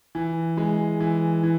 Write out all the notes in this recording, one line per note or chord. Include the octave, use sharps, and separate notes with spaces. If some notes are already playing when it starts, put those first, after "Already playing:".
E3
G#3
E3
E3